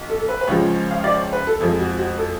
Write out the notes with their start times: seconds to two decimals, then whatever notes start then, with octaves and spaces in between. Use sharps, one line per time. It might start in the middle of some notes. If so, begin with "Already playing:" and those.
Already playing: B1
0.10 A4
0.20 A4
0.29 B4
0.41 B4
0.47 C#2 C#3 F3 G#3 C#5
0.91 F5
1.04 D5
1.18 C#5
1.33 B4
1.47 A4
1.60 F2 F3 G#3 A4
1.79 F#4
1.98 F#4
2.18 A4